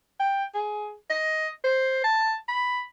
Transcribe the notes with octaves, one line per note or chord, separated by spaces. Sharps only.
G5
G#4
D#5
C5
A5
B5